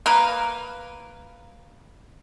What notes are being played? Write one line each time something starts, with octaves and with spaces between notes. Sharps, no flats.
A#3 A#4 B4